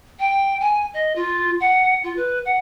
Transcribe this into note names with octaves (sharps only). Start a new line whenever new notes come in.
G5
G#5
D#5
F4
F#5
F4
B4
F#5